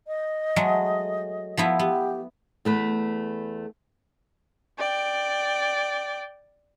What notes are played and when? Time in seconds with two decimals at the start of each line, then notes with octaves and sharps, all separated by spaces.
0.07 D#5
0.56 F#3 G#3 A3
1.57 F3 B3 E4
1.79 B3 G4
2.65 E2 A3 B4
4.79 D5 G5